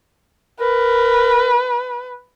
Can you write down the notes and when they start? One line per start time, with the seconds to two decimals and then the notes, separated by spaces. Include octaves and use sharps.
0.60 A#4 B4